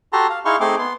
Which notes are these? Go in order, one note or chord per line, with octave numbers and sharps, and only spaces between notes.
F#4 G4 A4 A5 A#5 C6
F5
D#4 E4 G#4 F5 C6 C#6
A3 C4 D#4 G#4 C6 D6
B3 C6